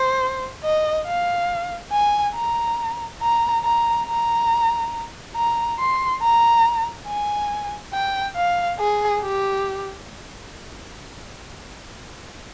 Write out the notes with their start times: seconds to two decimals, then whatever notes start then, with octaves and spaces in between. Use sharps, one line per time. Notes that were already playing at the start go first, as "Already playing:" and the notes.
Already playing: C5
0.63 D#5
1.07 F5
1.92 G#5
2.35 A#5
3.21 A#5
3.64 A#5
4.07 A#5
5.36 A#5
5.79 C6
6.22 A#5
7.08 G#5
7.93 G5
8.36 F5
8.79 G#4
9.22 G4